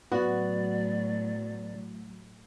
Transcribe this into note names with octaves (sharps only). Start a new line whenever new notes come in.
A2 F#3 B3 F#4 D5